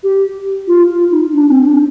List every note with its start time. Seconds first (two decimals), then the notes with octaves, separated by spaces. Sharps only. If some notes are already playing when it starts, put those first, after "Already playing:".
0.03 G4
0.67 F4
0.89 F4
1.11 D#4
1.33 D4
1.49 C4
1.65 D4